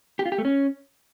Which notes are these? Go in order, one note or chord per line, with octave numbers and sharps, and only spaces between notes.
G4
F4
G4
A3
C#4